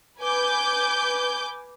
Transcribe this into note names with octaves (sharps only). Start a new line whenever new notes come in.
B4 G#5 D6 G6